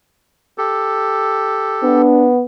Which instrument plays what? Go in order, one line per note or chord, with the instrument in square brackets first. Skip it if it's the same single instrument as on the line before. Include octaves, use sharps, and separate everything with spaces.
[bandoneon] G4 A4
[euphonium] B3 [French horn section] D4